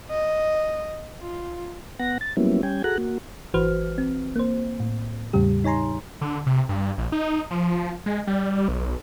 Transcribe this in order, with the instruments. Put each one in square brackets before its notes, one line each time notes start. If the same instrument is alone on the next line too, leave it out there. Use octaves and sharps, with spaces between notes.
[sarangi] D#5
F4
[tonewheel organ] B3 F#5 A#6
A6
F#3 G3 A#3 B3 C#4 E4
G3 C#4 G5 G#5
F#4 G#4 A4 F#5 A#5 F#6
A#3 F#4
[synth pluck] G#1 E3 F#4 B4 C5 F6
C4
A#3 C5
A2
E2 A2 C#3 G3 G4
D#4 C#5 G#5 A#5 C6
[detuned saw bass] D3
C3
G2
A#1
D#4
F3
G#3
G3
B1